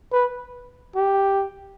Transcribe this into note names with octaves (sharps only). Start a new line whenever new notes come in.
B4
G4